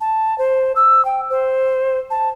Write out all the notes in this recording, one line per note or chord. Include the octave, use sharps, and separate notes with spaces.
A5
C5
E6
G5
C5
A5